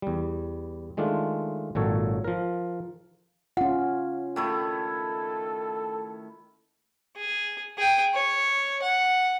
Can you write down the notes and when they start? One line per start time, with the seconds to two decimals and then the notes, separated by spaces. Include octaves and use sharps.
0.02 E2 G3
0.97 D#3 G#3 A3 D4 F4
1.75 G#1 A#2 F#3 A4 C#5
2.24 F3 A#4
3.57 C#4 F4 F#5
4.36 D#3 A3 E4 A4
7.16 G#4
7.78 G#4 G5
8.14 C#5
8.82 F#5